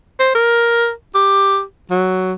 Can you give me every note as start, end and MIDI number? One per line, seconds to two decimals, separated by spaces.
0.20 0.35 72
0.35 0.90 70
1.15 1.62 67
1.91 2.33 54